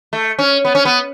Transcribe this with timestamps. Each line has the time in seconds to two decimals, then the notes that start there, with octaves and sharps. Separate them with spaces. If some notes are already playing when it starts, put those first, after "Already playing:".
0.13 A3
0.39 C#4
0.65 B3
0.75 C#4
0.85 B3